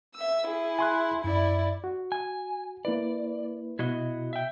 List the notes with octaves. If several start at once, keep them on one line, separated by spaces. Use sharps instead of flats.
E5 E6
E4 G#4
G#5 C6 F#6
F#2 E4 D5
F#4
G#5
A#3 E4 B4 D5
B2 E4 F#4 D#5
E5 G5